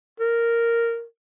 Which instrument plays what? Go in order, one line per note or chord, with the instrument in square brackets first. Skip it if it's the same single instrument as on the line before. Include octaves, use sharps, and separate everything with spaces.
[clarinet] A#4